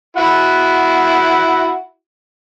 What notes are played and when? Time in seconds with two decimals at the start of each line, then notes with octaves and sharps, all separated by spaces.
0.17 E4 F#4 F#5